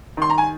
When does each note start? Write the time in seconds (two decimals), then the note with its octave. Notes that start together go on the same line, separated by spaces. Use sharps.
0.17 D#3 C6
0.30 A#5
0.38 G#5